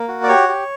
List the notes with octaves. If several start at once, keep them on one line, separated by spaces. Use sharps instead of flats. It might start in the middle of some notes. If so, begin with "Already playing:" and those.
Already playing: A#3
F#4
D5
G4 C#5
G4